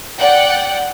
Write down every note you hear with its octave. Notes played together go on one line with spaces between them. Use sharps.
D5 F#5 G5